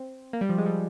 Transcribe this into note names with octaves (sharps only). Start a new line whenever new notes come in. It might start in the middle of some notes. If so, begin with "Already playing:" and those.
Already playing: C4
A#3
G3
F3
G#3
G3